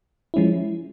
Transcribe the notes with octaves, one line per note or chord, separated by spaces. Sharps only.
F3 G#3 C#4 E4